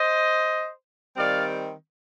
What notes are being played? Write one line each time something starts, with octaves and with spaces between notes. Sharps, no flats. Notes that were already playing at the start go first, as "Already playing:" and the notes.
Already playing: C5 D#5
D#3 G3 C4 D5 F5